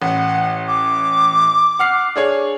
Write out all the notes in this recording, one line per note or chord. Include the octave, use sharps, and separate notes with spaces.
A1 F#5
D6
F#5 F6 C7
D4 G#4 C#5